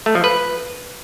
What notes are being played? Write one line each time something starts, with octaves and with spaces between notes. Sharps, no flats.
A3
F3
B4